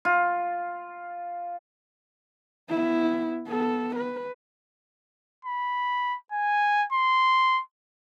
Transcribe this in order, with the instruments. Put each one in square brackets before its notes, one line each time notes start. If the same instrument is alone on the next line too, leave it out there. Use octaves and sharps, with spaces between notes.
[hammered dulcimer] F4
[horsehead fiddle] B3 E4
B3 A4
B4
[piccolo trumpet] B5
G#5
C6